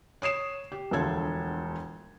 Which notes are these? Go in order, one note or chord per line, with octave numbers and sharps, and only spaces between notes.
C#5 D#6 C7 E7
G4
E1 D2 F3 A4 G#6